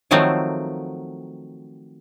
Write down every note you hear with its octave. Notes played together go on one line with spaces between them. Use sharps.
D#3 F3 F#3 A3 C4